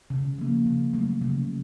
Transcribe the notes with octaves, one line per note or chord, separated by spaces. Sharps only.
C#3
F3 A#3
C#3
F#3 A3
C#3